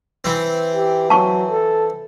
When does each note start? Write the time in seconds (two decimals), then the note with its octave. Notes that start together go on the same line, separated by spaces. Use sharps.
0.24 E3 C4
0.75 G4
1.10 F#3 A5 C#6
1.50 A4